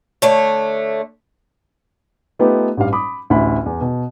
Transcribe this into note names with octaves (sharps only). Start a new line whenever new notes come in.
D3 A3 C#5
A3 B3 D#4 F4 G4 B4
A1 G2 G3 F5
B5 D6 D#6
A1 D2 E4 E5 B5
E2
B2